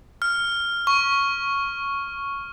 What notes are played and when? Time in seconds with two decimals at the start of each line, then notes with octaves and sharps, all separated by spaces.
0.22 F6
0.87 C#6